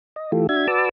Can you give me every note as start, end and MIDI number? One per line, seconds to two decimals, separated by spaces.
0.16 0.31 75
0.32 0.47 52
0.32 0.47 57
0.32 0.47 65
0.32 0.47 67
0.32 0.47 69
0.49 0.67 62
0.49 0.67 66
0.49 0.67 76
0.49 0.67 92
0.68 0.89 66
0.68 0.89 71
0.68 0.89 74
0.68 0.89 81
0.68 0.89 86
0.68 0.89 88